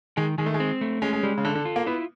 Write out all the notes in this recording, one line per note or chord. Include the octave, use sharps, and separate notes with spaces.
D#3 G#3
D#3 G#3
A3
G#3
C4
A3
G#3 C#4
G#3
G3 G#3
C#3
D3 A4
D3
F4
A#3
B3 E4